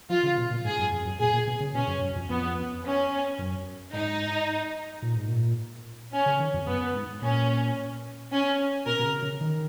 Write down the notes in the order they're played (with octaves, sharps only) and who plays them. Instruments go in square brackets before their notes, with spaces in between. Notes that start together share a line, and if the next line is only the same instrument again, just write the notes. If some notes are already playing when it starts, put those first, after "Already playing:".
[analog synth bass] F3 [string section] F4
[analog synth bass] C#3
B2
A#2
[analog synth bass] G#2 [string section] G#4
[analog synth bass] F#2
F2
F#2
[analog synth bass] A#2 [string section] G#4
[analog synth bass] A#2
B2
C#3
[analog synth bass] B2 [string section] C#4
[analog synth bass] F#2
F#2
F2
[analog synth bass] F2 [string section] B3
[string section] C#4
[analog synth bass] F#2
[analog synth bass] G#2 [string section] D#4
[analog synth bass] A#2
G#2
A#2
[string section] C#4
[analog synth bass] C#3
D#3
F2
[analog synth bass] F#2 [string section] B3
[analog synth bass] G#2
[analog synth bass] A#2 [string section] C#4
[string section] C#4
[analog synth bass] B2 [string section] A#4
[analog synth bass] B2
C#3
C#3
D#3